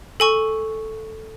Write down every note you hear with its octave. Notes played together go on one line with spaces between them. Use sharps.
A4 G#5 C#6